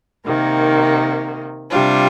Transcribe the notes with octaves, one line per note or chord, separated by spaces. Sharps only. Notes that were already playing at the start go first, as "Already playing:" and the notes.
C3 D#3 A#3
C3 G3 D4 F4